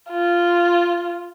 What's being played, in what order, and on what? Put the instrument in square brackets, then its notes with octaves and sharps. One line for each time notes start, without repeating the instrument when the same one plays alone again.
[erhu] F4